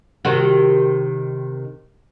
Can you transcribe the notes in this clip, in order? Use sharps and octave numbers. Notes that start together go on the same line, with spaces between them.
C3 D#3 F#4